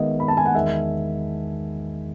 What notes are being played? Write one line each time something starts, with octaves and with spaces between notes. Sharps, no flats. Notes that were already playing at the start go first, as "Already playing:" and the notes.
Already playing: D#3 G#3 B3 D#5 E5
B5
A5
G#5
F#5
E2 D#3 G#3 E5